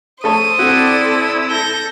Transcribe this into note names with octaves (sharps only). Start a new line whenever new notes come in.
A3 A4 C5 C#5 D#6
C4 E4 F#4 A4 D5
A4 G6 A#6